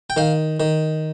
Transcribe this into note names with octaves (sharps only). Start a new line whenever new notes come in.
G5
D#3 F5
D#3